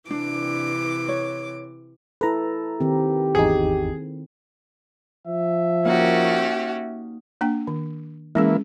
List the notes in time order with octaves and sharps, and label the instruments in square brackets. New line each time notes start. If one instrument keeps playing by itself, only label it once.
[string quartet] C3 E3 D6 [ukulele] D4
[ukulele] C#5
[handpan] E4 A4 [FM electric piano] B4 A#5
[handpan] D#3 C4 [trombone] G4
[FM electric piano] G#1 E2 D#4 [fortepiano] G#4
[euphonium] F3 [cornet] E5
[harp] A#3 D#4 [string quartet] C#4 F#4 G4
[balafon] A#3 D4 G5
D#3
[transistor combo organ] E3 A#3 E4 [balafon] G#3 C#4 G#4